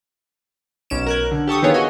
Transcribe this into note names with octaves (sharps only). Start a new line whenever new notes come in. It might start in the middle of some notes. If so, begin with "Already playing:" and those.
B1 C#4 D7 E7
A#4 F#6 G#6
D3
G4 A4 C#6 D#6
D#3 B3 F4 G4 G#4 C#5
F#4 D#5 G#5